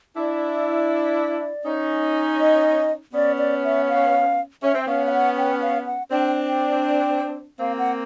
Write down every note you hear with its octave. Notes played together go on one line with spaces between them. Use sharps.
D4 E4 D5
C#4 D#4
D#5
B3 C#4 D5
D5
E5
F5
C#4 E5
C4
B3 C#4 F5
F5
F#5
G5
F5
F#5
C4 D4 G5
G5
A#3 C4 F5
F#5